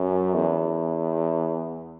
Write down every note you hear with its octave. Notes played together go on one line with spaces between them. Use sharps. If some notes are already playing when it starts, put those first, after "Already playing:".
Already playing: F#2
E2